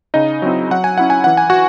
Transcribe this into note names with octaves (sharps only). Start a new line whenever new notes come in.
C#3 D#4 D#5
F#3 C4 E4
F#3 F#5
G#5
C#4 E4 F#5
G#5
E3 F#5
G#5
F#4 F#5